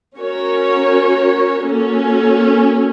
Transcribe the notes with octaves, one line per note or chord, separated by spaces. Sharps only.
C#4 F#4 A#4 C#5
A#3 C#4 F#4 A4